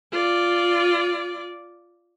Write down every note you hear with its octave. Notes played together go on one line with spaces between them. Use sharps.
F4 D5